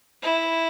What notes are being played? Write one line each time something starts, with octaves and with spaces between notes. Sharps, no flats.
E4